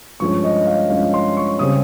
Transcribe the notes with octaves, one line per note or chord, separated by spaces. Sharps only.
G2 F3 G#3 C#4 C#6
D#5
F5
G2 F3 G#3 C#4 F5
C6
C#6
C#3 G3 C4 D#6